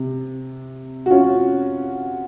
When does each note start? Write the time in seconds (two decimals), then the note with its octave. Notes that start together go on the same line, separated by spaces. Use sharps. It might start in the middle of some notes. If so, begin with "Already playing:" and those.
Already playing: C3
1.06 F#4
1.10 C#4 F4